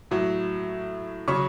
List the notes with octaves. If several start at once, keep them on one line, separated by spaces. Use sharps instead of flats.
A2 F#3
C#3 F#3 C#5 C#6